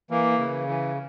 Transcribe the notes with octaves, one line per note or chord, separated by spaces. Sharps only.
E3 A#3
C#3
E3